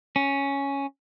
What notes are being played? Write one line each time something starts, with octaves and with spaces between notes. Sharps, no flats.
C#4